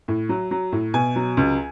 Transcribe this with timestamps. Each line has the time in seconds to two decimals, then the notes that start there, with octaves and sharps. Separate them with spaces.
0.08 A2
0.29 F#3
0.51 F#3
0.72 A2
0.94 B2 G#5
1.16 F#3
1.37 C#2